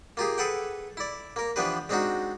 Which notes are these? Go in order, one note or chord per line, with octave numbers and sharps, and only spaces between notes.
A#3 F4 G4 G#4
G#4 A4 B4 F#5 G5
E4 D5
A#3 A#4
E3 F3 B3 D4 G4 B4
G#3 C4 D4 D#4 F#4